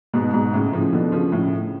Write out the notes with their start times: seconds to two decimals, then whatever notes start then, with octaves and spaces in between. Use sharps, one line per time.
0.13 G#2 B2
0.34 G#2 B2
0.53 A2 C#3
0.72 C#3 F3
0.93 B2 D3
1.12 C#3 F3
1.32 A2 C#3